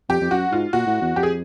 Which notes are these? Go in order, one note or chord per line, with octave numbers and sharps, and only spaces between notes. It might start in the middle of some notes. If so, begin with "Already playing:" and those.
F2 G4
F2
F#2 F#4
G#2 F4
A#2 F#4
A2
E2
F2 G4
G#4